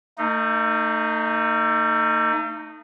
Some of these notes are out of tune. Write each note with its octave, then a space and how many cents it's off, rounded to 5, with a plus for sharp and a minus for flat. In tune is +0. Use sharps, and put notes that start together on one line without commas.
A3 +40 D#4 -10